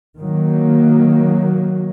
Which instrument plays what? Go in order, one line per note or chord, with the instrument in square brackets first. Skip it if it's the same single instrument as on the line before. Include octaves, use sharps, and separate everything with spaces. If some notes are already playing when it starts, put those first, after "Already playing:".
[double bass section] D#3 F#3 A#3